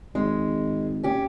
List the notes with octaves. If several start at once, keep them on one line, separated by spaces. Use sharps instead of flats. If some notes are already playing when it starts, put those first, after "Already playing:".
G#1 G#3
C#4 G4